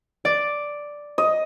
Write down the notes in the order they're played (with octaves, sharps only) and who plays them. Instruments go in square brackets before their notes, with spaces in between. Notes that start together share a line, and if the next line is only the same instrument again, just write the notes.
[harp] D5
[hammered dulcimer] D#5